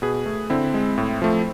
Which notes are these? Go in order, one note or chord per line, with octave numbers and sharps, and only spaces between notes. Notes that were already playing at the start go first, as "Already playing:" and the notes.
B2 G#4 B4
A3
D3 C4 E4
G#3
A2
F3 A3